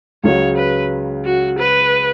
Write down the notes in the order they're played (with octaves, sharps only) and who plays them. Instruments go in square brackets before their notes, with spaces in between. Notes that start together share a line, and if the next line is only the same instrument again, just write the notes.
[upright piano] C#2 C#3 F#3 [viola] C#5
[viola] B4
F#4
B4